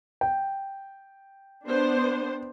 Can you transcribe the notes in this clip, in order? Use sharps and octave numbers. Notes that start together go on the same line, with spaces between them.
G5
B3 D4 C5